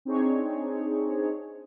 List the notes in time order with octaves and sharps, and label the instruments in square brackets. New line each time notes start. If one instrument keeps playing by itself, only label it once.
[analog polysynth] C4 D4 D#4 G#4 C#5